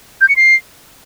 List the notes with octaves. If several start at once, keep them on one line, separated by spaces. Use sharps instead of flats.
G6
C#7
C7